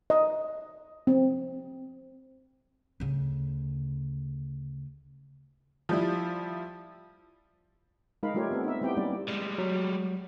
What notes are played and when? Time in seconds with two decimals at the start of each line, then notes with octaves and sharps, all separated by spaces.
0.10 D#5
1.07 C4
3.00 D2 C#3
5.89 F3 G3 E4
8.23 G#3 D#4 A#4 F5 B5
8.34 G3 A3 F4 G4 A#4 C#5
8.51 B3 C4 A4
8.64 D#4 E5
8.81 G3 B3 C4 E4 G4 G5
8.97 G3 A#3 C#4 D#4 D5
9.28 G3 G#3
9.58 F#3